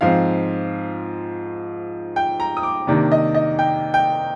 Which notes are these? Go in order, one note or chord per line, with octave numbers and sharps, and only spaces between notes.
G#2 F3 C4 F5
G5
A#5
D#6
D6
C3 D#3 A#3 D4
D#5
D#5
G5
G5